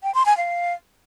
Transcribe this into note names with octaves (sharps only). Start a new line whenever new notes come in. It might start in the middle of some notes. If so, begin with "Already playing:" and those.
G5
C6
G#5
F5